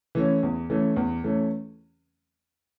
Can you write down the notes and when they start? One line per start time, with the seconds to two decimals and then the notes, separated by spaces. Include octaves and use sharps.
0.15 E3 A3 C#4
0.43 E2
0.70 E3 A3 C#4
0.96 E2
1.24 E3 A3 C#4